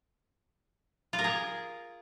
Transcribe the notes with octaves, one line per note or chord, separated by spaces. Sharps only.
F4
A#4
G#4